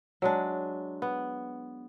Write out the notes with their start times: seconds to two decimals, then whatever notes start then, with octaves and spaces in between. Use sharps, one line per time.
0.22 F#3 G#3 D4
1.02 B3